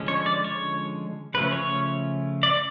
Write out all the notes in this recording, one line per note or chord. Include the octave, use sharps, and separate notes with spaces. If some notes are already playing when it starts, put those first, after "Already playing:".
Already playing: D3 F3 G#3 C#4
C#5
D5
C#5
C#3 F3 A3 C#4 B4
C#5
D5